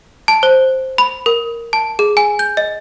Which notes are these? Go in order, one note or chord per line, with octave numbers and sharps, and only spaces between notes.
A5
C5
B5
A#4
A5
G#4
G#5
G6
D#5